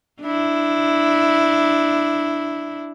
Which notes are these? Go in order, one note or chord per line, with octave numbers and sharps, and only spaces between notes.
D4 E4